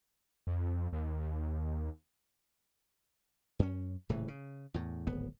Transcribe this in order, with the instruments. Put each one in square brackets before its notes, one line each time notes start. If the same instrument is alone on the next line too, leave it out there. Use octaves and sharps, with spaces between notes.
[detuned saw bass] F2
D#2
[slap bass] F#2 C#4
D#1 A2 C#3 E3
C#3
E2 A2
D1 G#1 B3